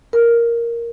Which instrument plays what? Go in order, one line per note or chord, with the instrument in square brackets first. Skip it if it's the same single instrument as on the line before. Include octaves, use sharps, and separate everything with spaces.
[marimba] A#4